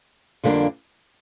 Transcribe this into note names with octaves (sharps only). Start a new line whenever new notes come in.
F2 D3 G3 A#3 D4